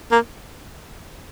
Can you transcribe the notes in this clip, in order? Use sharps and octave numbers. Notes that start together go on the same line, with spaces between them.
A#3